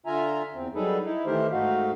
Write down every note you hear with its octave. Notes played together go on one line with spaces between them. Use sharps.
D3 F4 E5 G#5 A#5
E2 C4
F#3 G3 D#4 G#4 A4 B4
D#4 E4
D#3 E3 A3 G4 A#4 C5
G#2 A3 D#4 F#4 F5